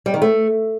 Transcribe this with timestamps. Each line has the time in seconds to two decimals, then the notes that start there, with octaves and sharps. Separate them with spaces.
0.06 G3
0.14 D#3
0.22 A3